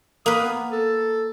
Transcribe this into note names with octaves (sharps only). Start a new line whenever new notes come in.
A#3 B4 D#6
B3
A4